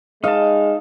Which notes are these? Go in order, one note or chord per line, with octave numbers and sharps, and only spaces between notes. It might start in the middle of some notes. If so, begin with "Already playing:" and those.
G#3 D#4 F5 A5